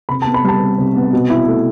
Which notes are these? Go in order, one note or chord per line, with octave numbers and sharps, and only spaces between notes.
C3 B5
A5
B3
B5
G3 A5
C3
C3
B3
B2
E4
A3